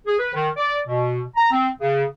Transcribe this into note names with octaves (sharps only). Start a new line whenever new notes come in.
G#4
B4
D#3
D5
B2
A#5
C4
C#3